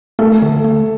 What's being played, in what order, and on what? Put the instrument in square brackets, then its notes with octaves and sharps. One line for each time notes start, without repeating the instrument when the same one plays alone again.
[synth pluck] A3 [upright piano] A4
[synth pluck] D3
A3